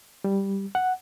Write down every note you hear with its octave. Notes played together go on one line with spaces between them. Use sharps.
G3
F#5